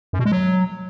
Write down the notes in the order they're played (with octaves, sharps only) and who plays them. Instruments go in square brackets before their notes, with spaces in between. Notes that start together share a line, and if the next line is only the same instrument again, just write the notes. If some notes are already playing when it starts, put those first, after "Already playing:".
[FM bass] F#2
B2
G#3
F#3